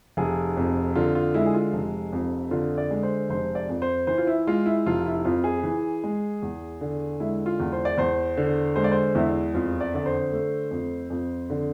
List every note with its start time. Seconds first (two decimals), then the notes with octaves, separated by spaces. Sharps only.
0.17 F1 G#4
0.57 F2
0.96 D3 F4
1.15 F4
1.34 G#3 E4
1.46 G#4
1.54 F4
1.73 F1
2.13 F2
2.51 D3 F4
2.78 D5
2.91 G#3
3.03 C5
3.30 F1 C5
3.55 D5
3.69 F2
3.82 C5
4.07 E3 C5
4.18 F4
4.27 E4
4.47 G#3 F4
4.66 E4
4.86 F1 F4
5.05 E4
5.25 F2 F4
5.44 G#4
5.63 E3
6.04 G#3
6.42 E2
6.81 D3
7.20 G#3 E4
7.46 F4
7.60 E2
7.72 C5
7.85 D5
7.98 E2 C5
8.37 D3
8.76 G#3 C5
8.84 D5
8.92 C5
9.15 E2 E4
9.54 F2 F4
9.81 D5
9.94 D3 D5
10.06 C5
10.32 A3
10.71 F2
11.10 F2
11.50 D3